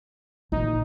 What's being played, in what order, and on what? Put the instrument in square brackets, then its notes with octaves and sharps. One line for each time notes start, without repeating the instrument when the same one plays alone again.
[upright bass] A#1 F3 [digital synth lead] D#4